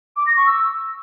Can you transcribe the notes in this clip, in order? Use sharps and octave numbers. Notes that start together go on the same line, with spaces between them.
D6
A#6
C#6
E6